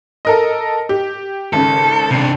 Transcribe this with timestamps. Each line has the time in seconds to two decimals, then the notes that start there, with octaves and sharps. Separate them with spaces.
0.25 A4 A#4 D#5
0.89 G4
1.53 G#1 C#3 A4
2.11 C3 D4